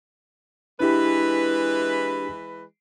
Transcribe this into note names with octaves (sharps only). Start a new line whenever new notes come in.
E3 G#3 D4 E4 G4 B4